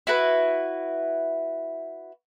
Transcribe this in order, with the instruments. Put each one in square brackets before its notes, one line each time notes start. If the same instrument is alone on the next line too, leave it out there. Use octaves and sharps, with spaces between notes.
[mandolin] E4 F#4 B4